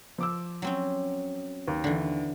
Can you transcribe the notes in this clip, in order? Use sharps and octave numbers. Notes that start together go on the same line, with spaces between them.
F3 D6 E6
F#3 C4 C#4
D#2
D3 E3